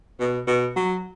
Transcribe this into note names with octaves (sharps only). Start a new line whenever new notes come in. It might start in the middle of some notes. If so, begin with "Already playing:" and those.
B2
B2
F#3